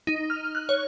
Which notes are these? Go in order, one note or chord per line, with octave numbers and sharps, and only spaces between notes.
D#4
F6
F#6
C#5